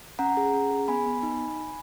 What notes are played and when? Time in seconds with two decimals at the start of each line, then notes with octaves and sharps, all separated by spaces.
0.19 C#4 F#5 A#5
0.37 G#4
0.54 C#4
0.71 G#4
0.88 B3 G#5 B5
1.06 B3
1.23 D#4